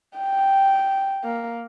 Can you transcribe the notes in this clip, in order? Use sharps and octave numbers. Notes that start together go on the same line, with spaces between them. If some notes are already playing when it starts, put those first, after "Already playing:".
G5
A#3